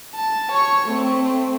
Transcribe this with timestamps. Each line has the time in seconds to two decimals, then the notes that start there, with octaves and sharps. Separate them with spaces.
0.16 A5
0.51 C#5 C#6
0.88 A3 C4